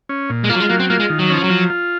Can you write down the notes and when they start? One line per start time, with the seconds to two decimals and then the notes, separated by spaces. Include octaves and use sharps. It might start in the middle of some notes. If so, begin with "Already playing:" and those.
0.09 C#4
0.30 A#2
0.44 G#3
0.50 A#3 F4
0.55 F#3
0.60 G#3
0.69 F#3 A#3
0.80 C4
0.90 A#3 F4
1.00 G#3
1.10 D#3
1.19 F#3
1.30 F3 C#4
1.44 F#3
1.50 F3
1.70 F4